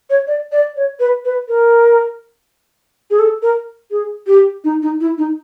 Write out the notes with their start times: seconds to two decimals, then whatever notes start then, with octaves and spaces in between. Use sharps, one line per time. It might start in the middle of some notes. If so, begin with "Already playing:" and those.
0.10 C#5
0.27 D5
0.52 D5
0.77 C#5
1.00 B4
1.25 B4
1.48 A#4
3.11 G#4
3.19 A4
3.42 A#4
3.91 G#4
4.27 G4
4.64 D#4
4.82 D#4
5.01 E4
5.18 D#4